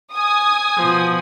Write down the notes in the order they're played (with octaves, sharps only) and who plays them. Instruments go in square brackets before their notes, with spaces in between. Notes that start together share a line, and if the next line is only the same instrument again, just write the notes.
[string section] G#5 D#6
[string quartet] B2 F3